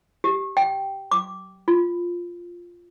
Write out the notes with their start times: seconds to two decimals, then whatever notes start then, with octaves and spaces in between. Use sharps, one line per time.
0.24 G4
0.57 G5
1.11 D6
1.68 F4